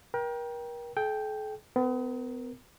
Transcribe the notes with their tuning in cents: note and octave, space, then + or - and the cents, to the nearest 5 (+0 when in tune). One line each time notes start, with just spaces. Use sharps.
A#4 +35 G5 +0
A4 -45 G5 +0
B3 +40 A#4 +0